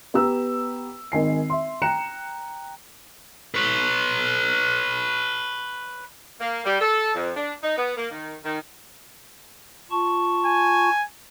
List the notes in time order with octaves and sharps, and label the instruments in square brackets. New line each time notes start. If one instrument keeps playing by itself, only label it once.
[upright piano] B3 G4 A#5 E6
G#1 D#3 G#5 C7
E5 C6
G5 A#5 F#6 C#7 E7
[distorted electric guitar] B4 C#5
[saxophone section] A#3
G3
A4
F2
D4
D#4
B3
A#3
D#3
D#3
[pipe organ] F4 A5 C#6
[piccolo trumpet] G#5